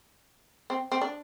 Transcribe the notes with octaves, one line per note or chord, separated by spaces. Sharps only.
C4
C4
D4